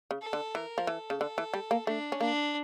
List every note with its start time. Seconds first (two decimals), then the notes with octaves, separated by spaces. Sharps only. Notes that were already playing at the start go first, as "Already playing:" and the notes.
0.11 C#3
0.21 A4
0.33 D3
0.55 E3 A#4
0.78 F3
0.87 E3 A4
1.10 C#3
1.21 D3 A4
1.38 E3
1.54 G3
1.71 A#3
1.87 A3 D4
2.12 C#4
2.20 A#3 D4